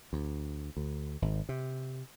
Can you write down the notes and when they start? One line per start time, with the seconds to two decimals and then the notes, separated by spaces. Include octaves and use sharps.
0.13 D2
0.77 D2
1.22 G#1
1.49 C3